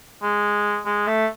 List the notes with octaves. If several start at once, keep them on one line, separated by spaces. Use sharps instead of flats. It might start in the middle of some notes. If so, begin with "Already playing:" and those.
G#3
G#3
A3